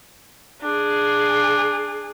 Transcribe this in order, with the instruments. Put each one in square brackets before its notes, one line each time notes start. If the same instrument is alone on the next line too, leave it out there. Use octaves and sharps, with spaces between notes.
[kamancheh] D4 G#4